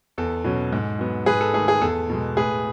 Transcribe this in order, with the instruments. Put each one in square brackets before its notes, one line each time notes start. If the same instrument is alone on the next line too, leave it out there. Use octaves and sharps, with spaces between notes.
[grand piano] E2 A4
B2 F#3 C#4
G#2
F#3 B3
G#2 G#4 B4
A4
D#3 A3 G#4
G#4
E2 A4
B2 G#3
A2 G#4 B4